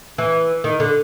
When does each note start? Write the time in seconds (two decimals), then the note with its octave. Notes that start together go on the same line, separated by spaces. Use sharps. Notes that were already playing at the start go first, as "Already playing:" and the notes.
0.18 E3
0.64 D#3
0.80 D3